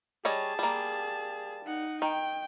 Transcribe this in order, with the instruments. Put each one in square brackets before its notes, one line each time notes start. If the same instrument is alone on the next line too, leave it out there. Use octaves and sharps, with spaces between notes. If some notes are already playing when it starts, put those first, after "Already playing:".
[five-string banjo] G3 C#5 D#5 [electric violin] G#4 A5
[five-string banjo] G3 A#3
[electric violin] D#4 F#5
[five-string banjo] D#3 [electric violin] G5